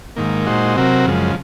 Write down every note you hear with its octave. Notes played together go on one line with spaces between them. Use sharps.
G#2 D#3 A#3
A#2 G#3 D#4 F#4 C5
C3 F#3 C4 F#4 A#4
F#2 C#3 F3 G#3